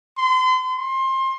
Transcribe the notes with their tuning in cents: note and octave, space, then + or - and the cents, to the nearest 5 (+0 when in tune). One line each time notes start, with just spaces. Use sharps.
C6 -35
C6 +25